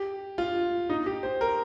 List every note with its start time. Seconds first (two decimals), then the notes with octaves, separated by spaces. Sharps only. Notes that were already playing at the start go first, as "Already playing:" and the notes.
Already playing: G4
0.38 F4
0.90 D#4
1.06 G4
1.23 C5
1.41 A#4